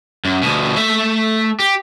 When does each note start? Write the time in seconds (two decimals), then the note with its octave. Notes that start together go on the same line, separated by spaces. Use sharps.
0.25 F#2
0.43 D2 B2
0.77 A3 E5
1.59 G4